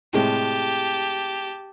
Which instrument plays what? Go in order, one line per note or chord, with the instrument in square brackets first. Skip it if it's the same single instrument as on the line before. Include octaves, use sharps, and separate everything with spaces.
[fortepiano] A2 C3 G#3 [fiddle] G4 A5